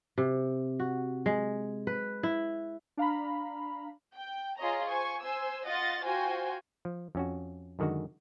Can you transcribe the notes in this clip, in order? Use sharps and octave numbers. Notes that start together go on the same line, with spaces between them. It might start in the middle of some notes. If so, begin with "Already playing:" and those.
C3
F#4
G#3
B4
E4
D4 F5 A#5 B5
G5
F4 G#4 C#5 D#5 A#5
C5 G#5 C#6
C5 G#5 E6
F4 D#5 F#5 A6
F4 F#4 C5 G5 G#5
F3
F2 C#4 F#4
F#2 D3 D#3 G#3 F#4